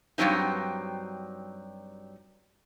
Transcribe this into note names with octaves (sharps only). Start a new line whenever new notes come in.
G2 A#2 F#3 C4 D#4